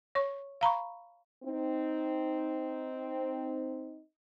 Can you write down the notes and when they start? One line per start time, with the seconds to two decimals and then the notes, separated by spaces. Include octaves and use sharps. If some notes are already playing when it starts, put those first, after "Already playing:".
0.15 C#5 C#6
0.61 F5 A#5 B5 C#6
1.44 C4 D#4